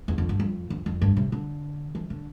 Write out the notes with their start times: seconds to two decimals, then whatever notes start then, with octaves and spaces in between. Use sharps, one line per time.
0.08 E2
0.18 F2
0.29 G2
0.40 F2
0.70 F2
0.86 F2
1.02 G2
1.17 C3
1.32 D3
1.95 E3
2.10 D3